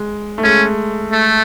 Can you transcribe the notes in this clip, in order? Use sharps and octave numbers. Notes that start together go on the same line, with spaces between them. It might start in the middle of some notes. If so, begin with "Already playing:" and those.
Already playing: G#3
A3
G#3 C#4
A3